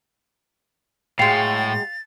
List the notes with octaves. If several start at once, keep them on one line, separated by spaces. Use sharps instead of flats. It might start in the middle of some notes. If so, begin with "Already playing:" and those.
A2 F#3 G#3 F5 G5 A6